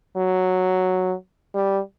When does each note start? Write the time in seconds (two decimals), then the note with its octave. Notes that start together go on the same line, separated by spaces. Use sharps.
0.17 F#3
1.55 G3